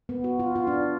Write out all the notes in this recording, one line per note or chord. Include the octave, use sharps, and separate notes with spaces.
B3
F#4
F4
F4
D4